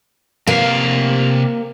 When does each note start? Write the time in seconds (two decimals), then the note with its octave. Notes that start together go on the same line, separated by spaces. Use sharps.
0.47 C3 A#3 F5